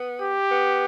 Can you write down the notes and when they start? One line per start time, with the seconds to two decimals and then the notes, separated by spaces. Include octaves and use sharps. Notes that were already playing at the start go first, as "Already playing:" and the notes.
Already playing: B3
0.21 G4
0.51 B3